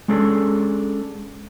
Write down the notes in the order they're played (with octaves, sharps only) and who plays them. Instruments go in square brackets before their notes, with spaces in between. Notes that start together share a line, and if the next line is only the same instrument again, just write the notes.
[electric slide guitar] G#3 C#4 D4 G#4 A4